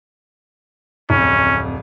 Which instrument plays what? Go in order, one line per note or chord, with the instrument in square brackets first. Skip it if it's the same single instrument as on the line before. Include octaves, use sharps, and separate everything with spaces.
[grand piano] D1 F2 [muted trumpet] C#4